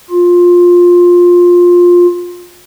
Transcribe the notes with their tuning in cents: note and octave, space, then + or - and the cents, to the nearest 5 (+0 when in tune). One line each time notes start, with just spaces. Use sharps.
F4 +15